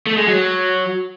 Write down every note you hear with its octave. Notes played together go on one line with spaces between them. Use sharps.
A3
G#3
F#3